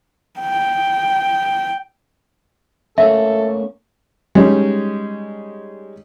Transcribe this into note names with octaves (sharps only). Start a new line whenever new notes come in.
G5
A3 A#3 C#4 A4 E5
G3 G#3 C#4 D#4